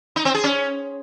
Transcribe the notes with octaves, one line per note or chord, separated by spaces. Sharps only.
D#4
C4
G#4
C#4